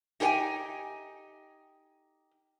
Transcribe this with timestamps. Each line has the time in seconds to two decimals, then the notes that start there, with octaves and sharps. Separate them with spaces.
0.20 D#4 G4 G#4 C#5 G5 G#5